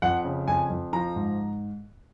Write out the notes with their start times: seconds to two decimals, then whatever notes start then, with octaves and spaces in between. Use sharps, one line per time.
0.02 F2 F#5
0.25 C#3
0.48 F2 G#5
0.70 F2
0.93 F3 A#5
1.16 G#2